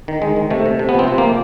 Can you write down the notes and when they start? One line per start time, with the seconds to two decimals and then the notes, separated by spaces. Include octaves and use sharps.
0.08 D#3
0.22 D#3 G#3
0.36 D#3
0.50 C3 A3
0.66 C3
0.79 C3
0.89 B3
0.94 F3 C4
1.08 C3
1.18 A#3
1.24 F3